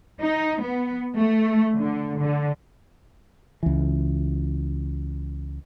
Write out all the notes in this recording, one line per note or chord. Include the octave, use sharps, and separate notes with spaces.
D#4
B3
A3
D3
D3
C#2 E3